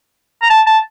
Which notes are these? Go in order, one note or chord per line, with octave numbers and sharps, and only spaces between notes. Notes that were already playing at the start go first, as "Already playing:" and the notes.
A#5
A5
A5